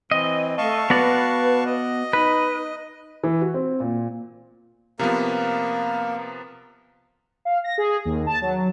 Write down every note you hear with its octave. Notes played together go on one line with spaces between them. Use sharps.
E3 C4 D#5
A3 F5 A5 C#6
B3 F#4 B4 D5
D#5
D#4 B4
E3
F#4
C4
A#2
C3 F3 A#3 B3 A#4
F5
A#6
G#4
D#2
A5
F#3